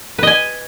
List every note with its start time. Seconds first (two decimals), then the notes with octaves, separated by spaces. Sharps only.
0.18 B4
0.23 D#5
0.27 G#5